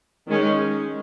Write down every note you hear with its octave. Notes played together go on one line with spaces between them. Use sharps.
D#3 G#3 C#4